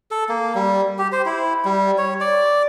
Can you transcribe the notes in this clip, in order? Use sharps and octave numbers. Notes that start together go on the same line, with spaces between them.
A4
A#3
G3
G4
C5
E4
G3
C#5
D5